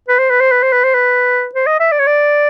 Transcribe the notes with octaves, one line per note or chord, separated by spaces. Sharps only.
B4
C5
B4
C5
B4
C5
B4
C5
B4
C5
D#5
E5
D5
C#5
D5